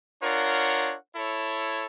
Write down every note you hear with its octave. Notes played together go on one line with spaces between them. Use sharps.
D4 F4 A#4 C#5 F#5
E4 A4 C#5